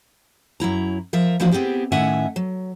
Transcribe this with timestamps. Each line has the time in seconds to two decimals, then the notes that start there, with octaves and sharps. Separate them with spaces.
0.60 F#2 F#3 E4 A#5
1.13 F3 A#4 E5
1.40 E3 F3 A#3 D4 E4 F#4
1.51 B3 C4 E4 G4 G#4
1.92 A2 D#3 C#4 E5 F#5 G#5
2.36 F#3